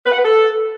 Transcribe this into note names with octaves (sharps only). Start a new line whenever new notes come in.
B4
F#5
B4
A4